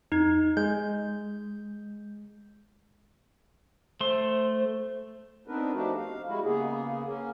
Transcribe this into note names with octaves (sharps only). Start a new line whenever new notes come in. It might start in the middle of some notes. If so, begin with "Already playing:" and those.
F2 D#4 G#6
G#3 G6
A3 C5 C6
B3 C4 D4 D#4 A#4 B4
F3 A3 D4 D#4 F#4 G4
F5
G3 G#3 E4 F#4
C#3 A#3 B3 G#4
A#3 C#4